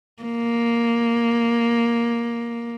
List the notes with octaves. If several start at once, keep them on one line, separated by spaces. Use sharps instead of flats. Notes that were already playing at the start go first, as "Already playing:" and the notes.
A#3